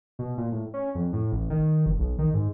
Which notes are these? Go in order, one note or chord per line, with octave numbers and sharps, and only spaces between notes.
B2
A#2
A2
C#4
F2
A2
A1
D#3
G1
B1
D#3
G#2